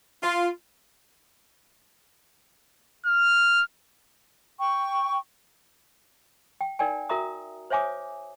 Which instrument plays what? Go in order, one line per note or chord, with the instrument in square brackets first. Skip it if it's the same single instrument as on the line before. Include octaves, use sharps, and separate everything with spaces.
[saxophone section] F4
[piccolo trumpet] F6
[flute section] G5 C#6
[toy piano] G5
D#4 A#4 D5 G5 G#5
F#4 A#4 E5 A#5 D#6
C5 C#5 E5 G#5 D6 D#6